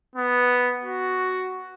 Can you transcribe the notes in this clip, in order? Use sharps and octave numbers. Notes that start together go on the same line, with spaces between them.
B3
F#4